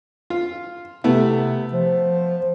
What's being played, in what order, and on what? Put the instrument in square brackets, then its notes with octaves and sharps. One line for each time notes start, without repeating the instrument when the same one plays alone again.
[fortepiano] F4
[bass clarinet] C3 [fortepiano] A3 B3 E4
[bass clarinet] F3